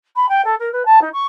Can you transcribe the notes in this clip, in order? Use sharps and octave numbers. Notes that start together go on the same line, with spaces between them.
B5
G5
A4
A#4
B4
A5
D#4
C#6